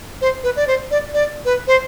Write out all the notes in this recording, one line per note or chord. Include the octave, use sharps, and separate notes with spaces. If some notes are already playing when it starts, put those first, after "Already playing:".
C5
B4
D5
C5
D5
D5
B4
C5